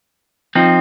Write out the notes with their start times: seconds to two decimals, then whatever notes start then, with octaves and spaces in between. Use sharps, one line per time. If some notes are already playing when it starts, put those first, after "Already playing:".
0.55 F3 C4 D#4